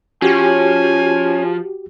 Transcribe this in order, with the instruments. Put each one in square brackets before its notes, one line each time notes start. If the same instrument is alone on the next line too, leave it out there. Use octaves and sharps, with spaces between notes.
[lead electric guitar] F3 [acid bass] C#4 [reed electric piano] F#4 G4 [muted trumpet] G#5